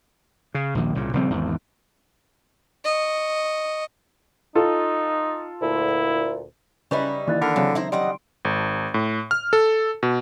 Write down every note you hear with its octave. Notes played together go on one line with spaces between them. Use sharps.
C#3
A#1 D#2
C2 A#2 C#3
A#1 C#3 G3 C4
G#1 E2
D#5 C#6
D#4 F4 A4
D2 A#2 E4
C#3 G3 C#4 D#4 E4 B4 C#6
D#3 E3 A#3 D5 F#6 A6
D3 A#4 B5
C#3 F#3 C4 A4
C#3 D#4 E4 C5 A#5
F#3 G3 D#5 F#5 C6 D7
G#1
A2
F6
A4
B2